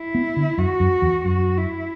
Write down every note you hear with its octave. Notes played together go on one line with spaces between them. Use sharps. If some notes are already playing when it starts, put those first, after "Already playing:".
Already playing: E4
B3
D3
F#2 F#4
F#2
E2
F#2 F#4
E4